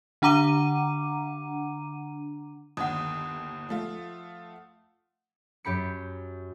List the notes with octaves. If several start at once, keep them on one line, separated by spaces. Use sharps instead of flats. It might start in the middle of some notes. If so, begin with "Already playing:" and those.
D3 D4 F#5 A#5 D6 D#7
G1 D#2 F#5 D#6
F3 A3 F4
F#2 G4 B5 C#7